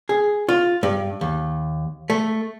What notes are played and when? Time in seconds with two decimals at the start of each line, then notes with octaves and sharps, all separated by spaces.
0.09 G#4
0.49 F4
0.83 G2
1.21 D#2
2.10 A3